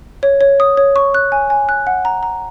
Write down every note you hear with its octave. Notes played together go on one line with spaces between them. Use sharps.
C#5
C#5
D#6
C#5
C#6
F#6
G#5
G#5
F#6
F#5
A#5
A#5